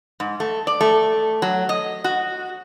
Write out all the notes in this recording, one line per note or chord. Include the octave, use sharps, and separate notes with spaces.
G#2
A3
D5
A3
F#3
D#5
F#4